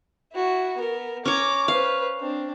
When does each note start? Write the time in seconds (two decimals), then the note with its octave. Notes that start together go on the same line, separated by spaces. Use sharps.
0.33 E4 F#4
0.76 B3 A#4
1.25 C#4 C#5 A#5 D6
1.68 B4 C5 F5
2.20 C4 D4